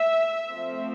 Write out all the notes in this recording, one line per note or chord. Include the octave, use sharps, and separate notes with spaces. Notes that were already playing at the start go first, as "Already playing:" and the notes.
Already playing: E5
F3 A3 C4